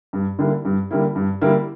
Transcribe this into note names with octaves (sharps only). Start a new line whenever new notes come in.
G2
D3 G3 A#3 E4
G2
D3 G3 A#3 E4
G2
D3 G3 A#3 E4